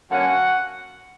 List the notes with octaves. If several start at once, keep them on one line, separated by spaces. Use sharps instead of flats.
D3 F#3 A#3 C#4 F#4 F#5